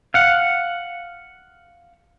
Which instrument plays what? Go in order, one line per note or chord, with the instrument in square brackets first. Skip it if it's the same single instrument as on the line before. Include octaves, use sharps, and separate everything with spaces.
[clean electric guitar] F5 F#5